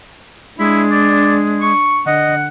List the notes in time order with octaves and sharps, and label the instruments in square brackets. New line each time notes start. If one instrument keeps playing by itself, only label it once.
[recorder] G#3 [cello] D4 [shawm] E4
[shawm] D5
C#6
[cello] D3 [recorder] D#5 [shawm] F#5